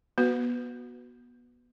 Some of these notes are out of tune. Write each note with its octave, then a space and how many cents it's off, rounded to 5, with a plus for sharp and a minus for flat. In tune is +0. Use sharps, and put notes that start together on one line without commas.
B3 -25 F#4 +0 B4 +20